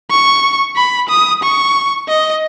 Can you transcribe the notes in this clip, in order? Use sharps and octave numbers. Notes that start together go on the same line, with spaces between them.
C#6
B5
D#6
C#6
D#5